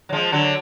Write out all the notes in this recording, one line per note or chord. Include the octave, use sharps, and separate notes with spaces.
F#3
F3 G#3
D3 F#3